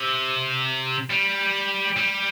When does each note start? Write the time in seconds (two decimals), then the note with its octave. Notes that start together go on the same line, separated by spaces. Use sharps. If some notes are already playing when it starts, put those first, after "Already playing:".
Already playing: C3
1.10 G3
1.96 G3